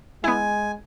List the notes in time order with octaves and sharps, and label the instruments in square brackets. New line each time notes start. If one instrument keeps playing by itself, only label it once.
[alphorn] G#3 [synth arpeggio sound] B3 E4 [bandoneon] G#5